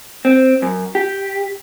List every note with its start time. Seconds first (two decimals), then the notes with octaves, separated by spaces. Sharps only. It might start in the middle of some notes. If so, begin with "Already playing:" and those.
0.25 C4
0.62 F#2
0.95 G4